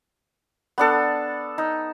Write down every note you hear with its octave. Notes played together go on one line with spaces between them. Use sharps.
B3 D4 A4
D#4